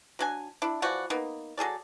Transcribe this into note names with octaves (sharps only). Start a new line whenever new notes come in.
F#3 D4 G#5
D4 E4
E3 F3 F#4 D5
A#3 B3 D#4
F#3 G#4 A4 D5